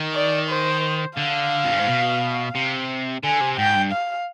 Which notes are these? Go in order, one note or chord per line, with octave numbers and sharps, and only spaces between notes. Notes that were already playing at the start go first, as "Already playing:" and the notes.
Already playing: D#3
D5
C5
D3 F5
F2
G2
G#2
B2
C3
D3 G#5
C3
G#2 G5
G2
F5